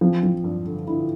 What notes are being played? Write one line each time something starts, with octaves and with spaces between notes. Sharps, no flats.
F3 C4
F3
G2 D4
D3
D3 E4